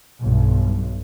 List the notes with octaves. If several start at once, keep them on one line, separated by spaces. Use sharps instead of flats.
B1 G2